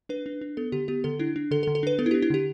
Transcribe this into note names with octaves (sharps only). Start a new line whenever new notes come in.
D4 B4
D4
D4
B3 A4
D3 G4
B3 G4
D3 A4
D4 E4
D4
D3 A4
A4
D3
A4
D4 B4
B3 A4
E4
D4 G4
E4
D3 G4